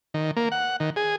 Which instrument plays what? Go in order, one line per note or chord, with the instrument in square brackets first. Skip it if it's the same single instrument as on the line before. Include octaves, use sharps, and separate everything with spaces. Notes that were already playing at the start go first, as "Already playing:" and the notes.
[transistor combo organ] D#3
A#3
F#5
D#3
G#4